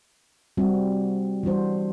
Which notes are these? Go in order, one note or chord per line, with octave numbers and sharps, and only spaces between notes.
G3 C4 F#4
E3 G3 D4 F#4 C5